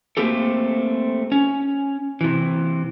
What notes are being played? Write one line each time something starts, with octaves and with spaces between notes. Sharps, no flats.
A3 A#3 C4 G4 A4
C#4
C3 E3